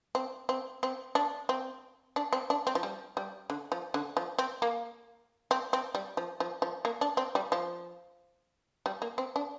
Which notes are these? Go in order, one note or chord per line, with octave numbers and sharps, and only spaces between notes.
C4
C4
C4
D4
C4
D4
C4
D4
C4
F3
G3
G3
D3
F3
D3
F3
C4
A#3
C4
C4
G3
F3
F3
F3
A#3
D4
C4
G3
F3
G3
A#3
C4
D4